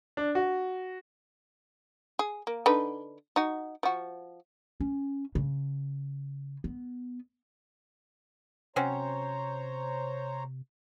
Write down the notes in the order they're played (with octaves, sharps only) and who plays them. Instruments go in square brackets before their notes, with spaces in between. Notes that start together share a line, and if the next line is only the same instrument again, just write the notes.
[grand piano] D4
F#4
[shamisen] G#4
A#3
D3 D#4 B4
D#4 F#4
F3 F#4
[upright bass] C#4
C#3
B3
[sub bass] C3 [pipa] F#3 C4 C#4 [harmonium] C5 C#5 A#5